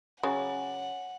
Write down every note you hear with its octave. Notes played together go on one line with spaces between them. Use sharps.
C#3 F#3 C#5 F#5 G#5